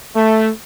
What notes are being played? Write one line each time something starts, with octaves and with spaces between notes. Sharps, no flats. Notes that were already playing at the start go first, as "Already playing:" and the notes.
A3